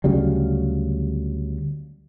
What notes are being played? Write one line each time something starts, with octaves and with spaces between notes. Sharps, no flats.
D2 C#3 F#3 G3